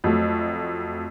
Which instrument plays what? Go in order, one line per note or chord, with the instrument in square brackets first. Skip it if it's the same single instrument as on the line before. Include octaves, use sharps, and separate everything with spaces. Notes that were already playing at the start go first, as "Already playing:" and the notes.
[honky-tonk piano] F2 F#3 A3